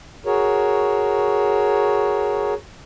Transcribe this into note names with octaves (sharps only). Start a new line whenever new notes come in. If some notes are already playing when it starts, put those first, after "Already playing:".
F#4 G#4 A#4 C#5